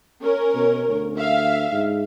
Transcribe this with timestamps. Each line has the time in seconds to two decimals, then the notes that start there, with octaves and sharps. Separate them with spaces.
0.22 C#4 A#4
0.55 B2
0.89 D2
1.18 E5 F5
1.73 G#2